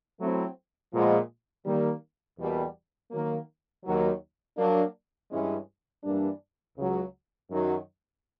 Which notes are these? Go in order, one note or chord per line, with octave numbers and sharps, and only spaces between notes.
F#3 A3 C4 E4
A#2 F3 G#3 B3
D#3 G3 A#3
E2 B2 G3 A#3
D#3 F#3 A#3
D#2 D#3 F#3
F#3 A#3 D4
G2 E3 G#3 C#4
G2 E3 G3 A#3 D4
C#2 C#3 F#3
F#2 D#3 F#3